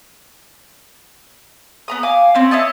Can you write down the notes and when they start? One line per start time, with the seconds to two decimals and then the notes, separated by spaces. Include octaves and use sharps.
1.88 B3 A#5 D#6
2.03 F5 G#5 D6
2.35 C4 C#4
2.51 E4 C#5 D#5 A5